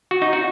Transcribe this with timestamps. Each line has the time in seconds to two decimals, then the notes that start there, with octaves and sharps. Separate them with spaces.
0.11 F#4
0.22 D#4
0.33 F#4